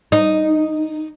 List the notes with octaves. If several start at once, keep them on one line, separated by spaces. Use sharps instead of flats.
D#4